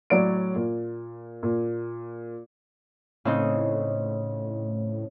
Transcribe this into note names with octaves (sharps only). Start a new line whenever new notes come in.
A2 F#3 C#5 D5 D7
A#2
A#2
A2 C#3 C4 D#4